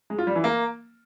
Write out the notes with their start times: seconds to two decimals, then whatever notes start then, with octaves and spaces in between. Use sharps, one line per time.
0.10 G#3
0.18 F4
0.27 G3
0.35 E3
0.44 A#3